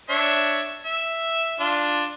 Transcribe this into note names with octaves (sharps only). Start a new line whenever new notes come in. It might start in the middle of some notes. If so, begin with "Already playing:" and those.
D4 C#5 E5
E5
D4 F4